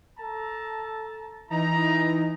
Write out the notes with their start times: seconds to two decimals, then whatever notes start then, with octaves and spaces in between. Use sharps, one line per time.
0.19 A4 A5 A#5
1.50 E3 D#4 E4 A#5